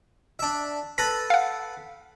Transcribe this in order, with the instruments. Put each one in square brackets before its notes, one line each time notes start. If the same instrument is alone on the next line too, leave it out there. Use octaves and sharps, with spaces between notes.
[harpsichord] D4 E5
[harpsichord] A4 B4 B5 [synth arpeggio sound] A#6
[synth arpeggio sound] F5 F#5